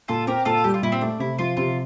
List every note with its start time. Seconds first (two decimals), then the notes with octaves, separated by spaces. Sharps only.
0.08 A#2 F4 A4
0.27 C4 G4 A#4
0.45 A#2 F4 A4
0.64 G3 G4
0.74 F4
0.83 A#2 E4
0.92 C4
1.01 A3 D4
1.20 C3 E4
1.39 F3 F4
1.57 C3 F4